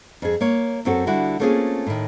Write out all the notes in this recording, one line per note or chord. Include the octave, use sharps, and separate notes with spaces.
F2 G#4
A#3 C#5
F#2 C4 F#4 A4
D3 G3 E4 F#4
A3 A#3 C4 C#4 F4 G#4
A2 D#3